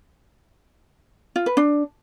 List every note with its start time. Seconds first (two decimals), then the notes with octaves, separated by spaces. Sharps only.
1.36 F4
1.46 B4
1.57 D4